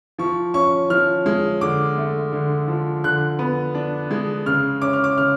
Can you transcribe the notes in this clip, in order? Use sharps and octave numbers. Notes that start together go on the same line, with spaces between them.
F3 C#6
C#4 C#6
F3 F6
G#3
D3 D6
A3
D3
F3
D3 F#6
B3
D4
G#3
C#3 F6
C#4 D6
F6
D6
C#3 F6